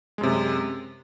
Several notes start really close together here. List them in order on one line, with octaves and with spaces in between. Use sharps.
G#3 F#2 C3